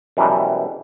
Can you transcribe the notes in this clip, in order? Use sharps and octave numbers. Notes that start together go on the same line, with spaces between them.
F#2 B2 E3 G3 G#3